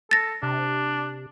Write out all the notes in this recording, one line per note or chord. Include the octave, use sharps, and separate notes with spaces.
A4 A6 A#6
C3 D4